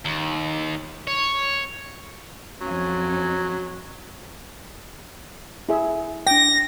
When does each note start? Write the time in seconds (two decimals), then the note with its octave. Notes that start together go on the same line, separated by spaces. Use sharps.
0.05 D#2
1.07 C#5
2.61 F2 F#3 C#4
5.69 E4 G#4 E5
6.27 D4 G5 A#6